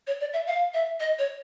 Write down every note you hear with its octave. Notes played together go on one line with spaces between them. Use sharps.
C#5
D5
E5
F5
E5
D#5
C#5